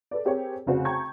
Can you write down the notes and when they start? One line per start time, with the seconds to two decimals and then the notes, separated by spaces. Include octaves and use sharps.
0.11 A4 B4 D5
0.25 C4 G4 G#4 A#4 C#5
0.66 F1 C#3 F#4 C5
0.85 G5 A5 A#5 C#6 G6 G#6